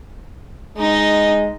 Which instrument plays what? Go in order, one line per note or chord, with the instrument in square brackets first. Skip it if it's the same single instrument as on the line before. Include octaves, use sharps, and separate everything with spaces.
[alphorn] G#3 [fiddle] D#4 D#5